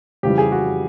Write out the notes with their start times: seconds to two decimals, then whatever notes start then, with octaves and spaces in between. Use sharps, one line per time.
0.23 F2 C#3 E3 G3 G4
0.38 G#4
0.52 F#4